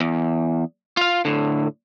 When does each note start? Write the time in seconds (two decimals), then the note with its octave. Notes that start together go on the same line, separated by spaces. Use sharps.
0.01 E2
0.97 F4 F5
1.25 A2 D3